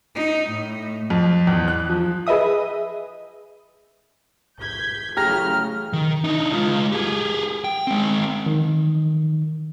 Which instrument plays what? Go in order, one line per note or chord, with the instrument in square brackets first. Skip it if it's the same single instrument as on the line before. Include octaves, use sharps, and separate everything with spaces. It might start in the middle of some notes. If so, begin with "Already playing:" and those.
[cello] D#4
A2
[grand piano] F2
E2
F#6
F3
[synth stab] G#4 B4 D#5 E5 D#6
[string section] G6 G#6 B6
[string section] A1 C#3 F#3 [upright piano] G4 A#5 A#6 [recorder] F6
[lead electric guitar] D#3
D4 D#4
G#3 F4
G4 G#4
G5
G#3 C4
[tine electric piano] D#3